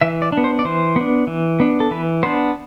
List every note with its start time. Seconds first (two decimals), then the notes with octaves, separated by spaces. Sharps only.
0.01 E3 E5
0.22 D5
0.32 D4
0.37 B3
0.44 C5
0.59 D5
0.65 E3 C5
0.96 B3 D4
1.27 E3
1.60 B3 D4
1.80 A4
1.91 E3 B4
2.23 B3 D4 C5